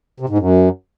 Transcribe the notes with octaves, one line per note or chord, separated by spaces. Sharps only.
C3
G#2
F#2